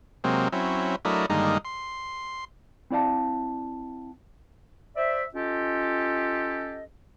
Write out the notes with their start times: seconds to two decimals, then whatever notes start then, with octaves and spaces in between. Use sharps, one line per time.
0.24 C3 F#3 G#3 A#3 C4
0.52 F#3 C4 C#4 E4
1.05 F#3 A3 D4 E4 A#4 D#5
1.30 G2 D3 D#3 G#3 A#3 D#4
1.65 C6
2.90 C4 E4 D5 F5 A5
4.97 C5 D5 E5
5.34 C#4 F4 G4 A4 D#5